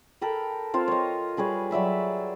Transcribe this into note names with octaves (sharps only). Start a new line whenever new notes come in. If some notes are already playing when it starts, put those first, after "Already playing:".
A4 A#4 G5 B5
C4 F4 C5 F5
C#5 D#5
G3 G#4 B4 C#5
F#3 D5 E5 B5